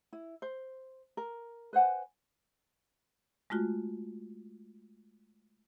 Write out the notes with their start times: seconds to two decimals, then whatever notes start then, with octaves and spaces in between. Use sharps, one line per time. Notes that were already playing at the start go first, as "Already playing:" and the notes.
0.13 E4
0.42 C5
1.17 A#4
1.73 B4 C5 F#5 G#5
3.50 G#3 A3 F4 F#4